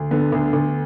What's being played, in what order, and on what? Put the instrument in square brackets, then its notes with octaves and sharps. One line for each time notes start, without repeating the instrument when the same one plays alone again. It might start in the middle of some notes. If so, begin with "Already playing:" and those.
Already playing: [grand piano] D2
D3 B3
D2
D2